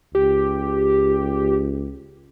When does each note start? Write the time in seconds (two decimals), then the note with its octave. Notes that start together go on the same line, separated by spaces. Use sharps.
0.15 C#2 G4